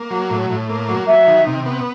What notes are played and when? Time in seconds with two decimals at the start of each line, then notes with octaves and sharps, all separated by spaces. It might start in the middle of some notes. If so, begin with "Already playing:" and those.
Already playing: A#3
0.11 F#3
0.30 A2
0.50 A2
0.69 A#3
0.89 F#3
1.07 F#3 E5
1.27 D#3
1.47 C3
1.66 B3